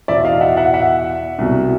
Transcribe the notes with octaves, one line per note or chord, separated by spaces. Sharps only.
E2 B2 D5 E5
D#5 F5
E5 F#5
E5 F#5
E5 F#5
C2 B2